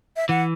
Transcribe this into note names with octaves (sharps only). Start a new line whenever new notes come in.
E5
E3 F#5